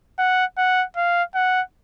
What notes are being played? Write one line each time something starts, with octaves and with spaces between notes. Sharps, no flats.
F#5
F#5
F5
F#5